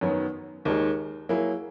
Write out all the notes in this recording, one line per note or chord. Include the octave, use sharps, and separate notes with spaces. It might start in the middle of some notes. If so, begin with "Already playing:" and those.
F#2 D#3 F#3 B3
D#2 D#3 G#3 D#4 A#4
F#3 A#3 E4 G#4